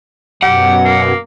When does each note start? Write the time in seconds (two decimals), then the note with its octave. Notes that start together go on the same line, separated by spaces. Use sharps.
0.43 F#2 B2 F#3 G4 F#5
0.85 A#3